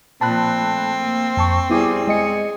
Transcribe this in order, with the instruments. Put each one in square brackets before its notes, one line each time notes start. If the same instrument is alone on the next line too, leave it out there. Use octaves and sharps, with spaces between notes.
[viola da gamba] A#2 F3 [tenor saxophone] C4 [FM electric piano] A5 B5 F#6
[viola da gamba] A3
A#3
[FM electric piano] F2 A5 C#6
[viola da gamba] G3 G#4 [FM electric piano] B3 E4 D6
[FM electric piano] G#3 D#5 C#7 [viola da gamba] G#4